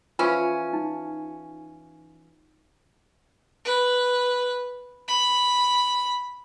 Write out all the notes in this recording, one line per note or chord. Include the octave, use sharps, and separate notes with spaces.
E3 F3 C#4 F4
D#4
B4
B5